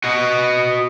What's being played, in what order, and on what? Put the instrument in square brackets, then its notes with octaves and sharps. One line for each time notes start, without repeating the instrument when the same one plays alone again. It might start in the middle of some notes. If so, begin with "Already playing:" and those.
[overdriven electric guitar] F#4 D#5